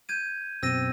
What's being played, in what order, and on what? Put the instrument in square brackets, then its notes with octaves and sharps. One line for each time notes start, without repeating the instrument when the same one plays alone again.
[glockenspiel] G6 G#6 D#7
[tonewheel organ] F#2 B2 C4 [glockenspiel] E6 A#6 D#7